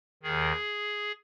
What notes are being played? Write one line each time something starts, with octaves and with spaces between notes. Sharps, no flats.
D#2 D#3 G#4